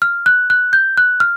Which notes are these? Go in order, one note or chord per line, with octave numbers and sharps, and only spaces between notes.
F6
F#6
F#6
G6
F#6
F6